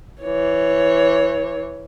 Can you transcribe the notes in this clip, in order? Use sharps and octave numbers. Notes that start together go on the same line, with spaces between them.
E3 C#5